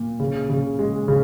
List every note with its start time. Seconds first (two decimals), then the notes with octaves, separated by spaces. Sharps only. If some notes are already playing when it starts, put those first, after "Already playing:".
Already playing: A#2
0.20 C#3
0.50 C#3
0.79 G#3
1.08 C#3